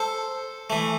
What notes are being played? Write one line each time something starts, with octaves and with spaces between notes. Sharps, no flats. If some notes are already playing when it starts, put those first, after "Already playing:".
Already playing: A4 C5
E3 A3